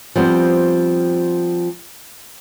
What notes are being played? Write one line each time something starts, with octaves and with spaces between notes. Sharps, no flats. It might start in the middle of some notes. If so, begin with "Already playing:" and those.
F3 G3 B3 C4